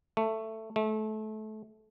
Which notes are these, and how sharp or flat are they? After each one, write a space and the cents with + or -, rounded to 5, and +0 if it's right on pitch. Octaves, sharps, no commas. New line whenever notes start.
A3 +10
A3 -25